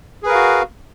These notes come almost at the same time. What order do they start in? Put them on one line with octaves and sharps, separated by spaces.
G#4 B4 A#4 F5 F#4